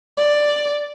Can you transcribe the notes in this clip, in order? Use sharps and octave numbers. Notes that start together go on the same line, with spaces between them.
D5